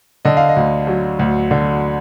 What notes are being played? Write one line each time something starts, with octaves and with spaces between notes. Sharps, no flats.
D3 D#5
F5
D#5
D2
F#3
D2
D3